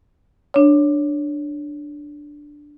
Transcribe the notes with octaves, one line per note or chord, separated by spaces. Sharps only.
D4 C#5